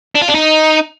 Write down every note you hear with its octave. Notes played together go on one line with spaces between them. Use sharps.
D4
F4
D4
D#4